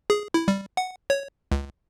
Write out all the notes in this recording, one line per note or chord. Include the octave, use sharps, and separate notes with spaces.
G#4
E4
G3
F#5
C#5
C#2